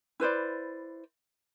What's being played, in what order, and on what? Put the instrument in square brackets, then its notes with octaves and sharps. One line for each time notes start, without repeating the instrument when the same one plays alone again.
[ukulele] E4 B4 C5 D5